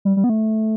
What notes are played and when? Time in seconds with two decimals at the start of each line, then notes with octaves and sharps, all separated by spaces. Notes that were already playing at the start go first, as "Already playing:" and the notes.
0.05 G3
0.17 G3
0.24 B3
0.29 A3